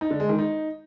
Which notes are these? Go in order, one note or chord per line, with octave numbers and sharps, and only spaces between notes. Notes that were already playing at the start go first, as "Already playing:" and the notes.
D#4
D3
G#3
D#3
D#4